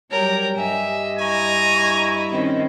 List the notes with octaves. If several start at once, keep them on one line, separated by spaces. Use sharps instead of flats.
F#3 G3 A#4 C#5 G5
G2 D#5 E5 G#5
E4 G#5 A#5 C#6
D#3 C4 C#4 D#5